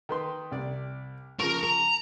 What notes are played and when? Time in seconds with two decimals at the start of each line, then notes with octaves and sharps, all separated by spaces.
0.09 D#3 B4 C6
0.52 C2 D5
1.40 C#3 F3 A#4 C#6
1.63 A#5